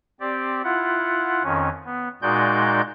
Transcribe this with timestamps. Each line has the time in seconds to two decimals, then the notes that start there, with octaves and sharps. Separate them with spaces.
0.20 C4 G4 D5
0.64 E4 F4 F#5
1.44 F2 D#3 C#4
1.85 B3
2.22 A#2 G#3 D#4 F#4 D5 G6